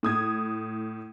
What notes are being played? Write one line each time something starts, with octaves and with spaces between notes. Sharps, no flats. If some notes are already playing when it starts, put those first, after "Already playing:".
A2 D#6 G#6